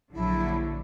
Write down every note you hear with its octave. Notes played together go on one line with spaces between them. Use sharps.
A#1 D3 F#3 E4